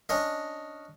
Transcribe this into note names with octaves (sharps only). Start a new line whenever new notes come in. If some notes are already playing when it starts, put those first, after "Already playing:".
C#4 D4 D#5